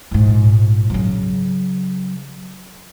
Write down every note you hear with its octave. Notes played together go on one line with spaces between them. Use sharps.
A#1 G#2
C#3 F#3